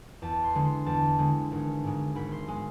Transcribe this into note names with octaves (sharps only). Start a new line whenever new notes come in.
E2 A5
C6
D3 G#3 B3
C6
E2 A5
D3 G#3 B3
G#1
G#2 G#3
G#1 B5
C6
G#3